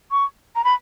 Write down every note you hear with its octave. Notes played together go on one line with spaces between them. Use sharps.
C#6
A#5
B5